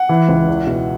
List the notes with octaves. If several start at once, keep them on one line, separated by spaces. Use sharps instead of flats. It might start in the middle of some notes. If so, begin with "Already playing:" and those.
Already playing: F#5
E3
C#2
E2
B2